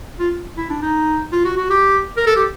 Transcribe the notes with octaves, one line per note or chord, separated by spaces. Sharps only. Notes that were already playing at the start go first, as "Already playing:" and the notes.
F4
E4
D4
D#4
F4
F#4
F#4
G4
A#4
A4
G4